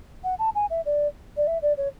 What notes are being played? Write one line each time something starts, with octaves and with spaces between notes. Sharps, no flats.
F#5
A5
G#5
E5
D5
D5
E5
D5
C#5